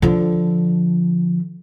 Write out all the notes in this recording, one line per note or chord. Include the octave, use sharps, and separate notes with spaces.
D3 F3